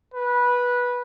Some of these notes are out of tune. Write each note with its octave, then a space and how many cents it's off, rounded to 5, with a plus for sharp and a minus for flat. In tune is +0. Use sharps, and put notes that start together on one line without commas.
B4 -15